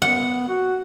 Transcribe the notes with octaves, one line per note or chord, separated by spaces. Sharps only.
B3 F#5
F#4